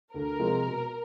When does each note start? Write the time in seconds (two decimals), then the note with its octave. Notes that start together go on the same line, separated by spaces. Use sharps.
0.14 D2 A#4
0.39 C3 F3 G#3 C4
0.65 B2